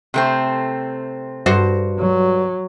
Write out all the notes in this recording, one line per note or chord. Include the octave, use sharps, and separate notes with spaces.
C3 A3 C4
G2 F#4 C5
F#3